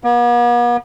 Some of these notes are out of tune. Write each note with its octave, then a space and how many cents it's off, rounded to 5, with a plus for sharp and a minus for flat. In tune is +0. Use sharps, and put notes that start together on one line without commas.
B3 -45